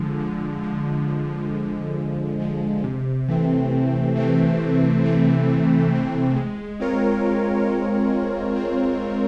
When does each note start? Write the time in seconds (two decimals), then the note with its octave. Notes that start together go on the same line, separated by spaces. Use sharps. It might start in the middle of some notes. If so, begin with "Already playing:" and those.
Already playing: D3 F3 G#3
0.19 D3
0.63 F3 G#3
1.08 D3
1.51 F3 G#3
1.96 D3
2.40 F3 G#3
2.84 C3
3.28 E3 A3 C4
3.72 C3
4.16 E3 A3 C4
4.60 C3
5.04 E3 A3 C4
5.48 C3
5.92 E3 A3 C4
6.36 G#3
6.80 C4 F4 A#4 C#5
7.25 G#3
7.68 C4 F4 A#4 C#5
8.12 G#3
8.56 C4 F4 A#4 C#5
9.00 G#3